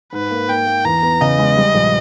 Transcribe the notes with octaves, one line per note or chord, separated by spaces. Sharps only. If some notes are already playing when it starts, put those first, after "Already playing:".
G#2 B4
A#3
A#3 G5
A#3
E2 A#5
B3
C#3 D#5
G#3
G3
A#1